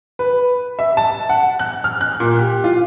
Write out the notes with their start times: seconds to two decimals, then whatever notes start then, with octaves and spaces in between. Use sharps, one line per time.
0.19 B4
0.79 E5
0.97 A5
1.29 F#5
1.59 F#6
1.84 F6
2.01 F#6
2.20 A#2
2.39 G4
2.64 F4